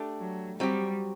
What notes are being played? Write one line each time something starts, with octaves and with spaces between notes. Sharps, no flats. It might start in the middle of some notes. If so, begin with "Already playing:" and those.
Already playing: A3 D4 G4
F#3
F#3 G3 C4 G4